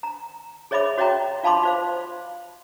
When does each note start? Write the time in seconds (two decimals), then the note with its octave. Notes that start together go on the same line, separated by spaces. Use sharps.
0.03 A#5
0.71 G#4 C#5 D#5 E5 B5 D6
0.98 F#4 C#5 D#5 E5 G5 A#5
1.43 F4 F5 A5 B5 C6 D6
1.63 F4 C5 F5